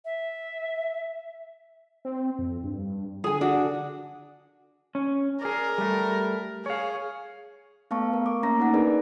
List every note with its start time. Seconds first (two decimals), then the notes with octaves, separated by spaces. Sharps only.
0.05 E5
2.05 C4
2.39 F2
2.64 G2
3.24 D3 G#4 G#5
3.41 D4 F#4
4.95 C#4
5.42 G#4 A#4 D5
5.78 G3 A3
6.66 G#4 C#5 F5
7.91 A3 B3 F5 A5 C#6
8.13 A#4
8.26 D6
8.43 A#3 C#4 A#5 A#6
8.60 D#4 A#4 F#5
8.74 D4 D#4 G#4 A#4 B4 D5